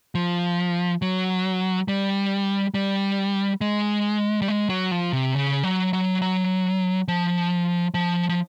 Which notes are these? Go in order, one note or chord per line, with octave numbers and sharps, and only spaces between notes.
F3
F#3
G3
G3
G#3
G3
G#3
F#3
F3
C3
C#3
F#3
F#3
F#3
F3
F3
F3